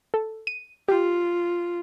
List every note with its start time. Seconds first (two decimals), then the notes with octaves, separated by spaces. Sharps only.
0.14 A4
0.47 D#7
0.88 F4 G4